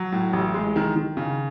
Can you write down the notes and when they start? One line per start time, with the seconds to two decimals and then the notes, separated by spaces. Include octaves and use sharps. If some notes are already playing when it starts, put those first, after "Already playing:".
Already playing: F#3
0.12 A2
0.33 A1
0.54 G#3
0.76 D#3
0.96 D#3
1.17 C#3